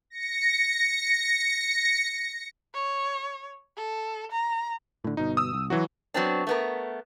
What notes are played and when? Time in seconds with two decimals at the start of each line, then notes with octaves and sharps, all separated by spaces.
0.10 A#6 C#7
2.74 C#5
3.77 A4
4.32 A#5
5.04 A2 D3
5.17 G1 B2 D#4
5.37 D#6 E6
5.53 C2
5.70 E3 F#3 F#4
6.14 F#3 B3 C4 D4
6.47 A3 B3 A#4